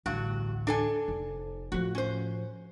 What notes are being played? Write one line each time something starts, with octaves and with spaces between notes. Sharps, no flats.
A1 D2 G2 F#4
D4 A4 G#5
F1
A2 F3 F#4
C#4 C5